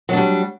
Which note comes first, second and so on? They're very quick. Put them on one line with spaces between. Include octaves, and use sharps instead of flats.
F#3 D4 G3